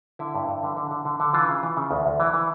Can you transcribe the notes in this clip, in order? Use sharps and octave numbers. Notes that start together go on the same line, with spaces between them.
D3 E4
G2
G2
D3
D3
D3
D3
D3
E3 F4
C#3
E3
C#3
D2
D2
E3
E3